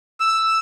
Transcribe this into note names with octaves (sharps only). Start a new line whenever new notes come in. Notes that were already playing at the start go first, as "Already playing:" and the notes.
E6